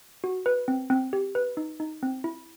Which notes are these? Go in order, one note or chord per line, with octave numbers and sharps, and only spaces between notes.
F#4
B4
C4
C4
G4
B4
D#4
D#4
C4
E4